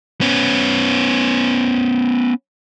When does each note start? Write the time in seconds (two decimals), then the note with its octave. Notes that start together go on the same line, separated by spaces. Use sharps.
0.21 B3 C#4